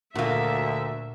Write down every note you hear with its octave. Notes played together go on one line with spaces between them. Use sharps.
D2 A#2 A#3 F4 F#4 E5